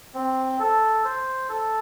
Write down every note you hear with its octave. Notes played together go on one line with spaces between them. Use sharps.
C4
A4
C5
A4